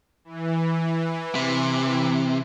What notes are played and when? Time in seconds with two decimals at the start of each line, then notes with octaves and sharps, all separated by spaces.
0.25 E3
1.35 C3